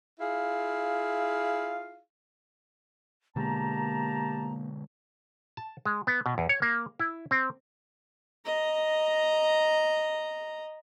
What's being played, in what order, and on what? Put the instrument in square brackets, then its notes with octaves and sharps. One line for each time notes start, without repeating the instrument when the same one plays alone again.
[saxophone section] E4 F4 G#4 F5
[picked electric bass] B2 D3 G#3 [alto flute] A#3 [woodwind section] G4 A5 A#5
[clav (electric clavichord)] A5
G#3
B3
B2
E2
C#5
A#3
E4
C4
[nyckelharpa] D#5 A#5